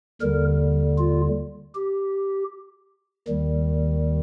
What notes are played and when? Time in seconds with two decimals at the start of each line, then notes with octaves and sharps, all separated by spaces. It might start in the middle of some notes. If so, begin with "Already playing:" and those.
0.22 D#2 D3 G3 A#4
0.98 F4
1.75 G4
3.28 D#2 D#3 G3